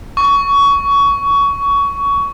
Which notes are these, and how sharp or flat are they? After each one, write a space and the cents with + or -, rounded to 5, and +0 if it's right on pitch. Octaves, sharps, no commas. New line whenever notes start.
C#6 +20